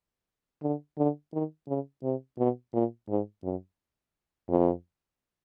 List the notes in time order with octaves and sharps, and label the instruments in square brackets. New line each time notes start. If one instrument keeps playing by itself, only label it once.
[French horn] D3
D3
D#3
C#3
C3
B2
A#2
G#2
F#2
F2